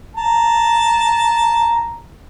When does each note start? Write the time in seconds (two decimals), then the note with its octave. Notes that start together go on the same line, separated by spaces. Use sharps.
0.16 A5 A#5